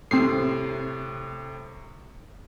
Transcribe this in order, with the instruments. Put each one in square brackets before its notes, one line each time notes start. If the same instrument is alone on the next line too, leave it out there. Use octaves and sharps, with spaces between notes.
[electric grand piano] A2 C3 [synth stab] C4 C7